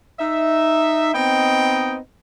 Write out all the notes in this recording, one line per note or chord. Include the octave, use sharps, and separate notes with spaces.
D#4 E5
B3 C4 D#4 D#5 G5